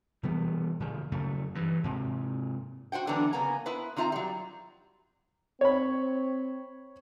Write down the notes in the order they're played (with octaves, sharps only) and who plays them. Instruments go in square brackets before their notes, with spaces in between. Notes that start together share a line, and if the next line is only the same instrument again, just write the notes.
[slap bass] B2 E3 G3 B3
A#2 D3 F3
F#2 C#3 A3
G2 E3
G#2 C3
[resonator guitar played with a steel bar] F#4 C5 F#5 G5
D3 E3 F#3 B3 D4
C#3 A#3 B3 G#5 A#5
B3 E4 B4 C5
D#3 C4 F4 E5 A#5
F#3 G3
[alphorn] C4 [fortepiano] C#5 B5